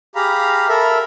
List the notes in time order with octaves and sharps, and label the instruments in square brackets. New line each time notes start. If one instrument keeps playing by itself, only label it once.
[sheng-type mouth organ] G4 G#4 F5 A#5 B5
A4 A#4 E5 B5